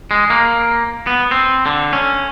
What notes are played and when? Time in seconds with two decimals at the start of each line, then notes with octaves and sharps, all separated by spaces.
0.11 G#3
0.30 A#3
1.07 B3
1.31 C4
1.66 D3
1.93 C#4